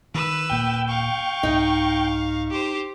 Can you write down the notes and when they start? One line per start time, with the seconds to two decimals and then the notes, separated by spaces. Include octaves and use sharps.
0.14 D#3 B4 E6
0.50 D#1 A#2 A#3 G5
0.88 F5 C#6
1.43 C2 G#2 D#4
2.50 G4 C5